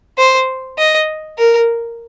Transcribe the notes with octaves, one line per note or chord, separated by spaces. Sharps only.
C5
D#5
A#4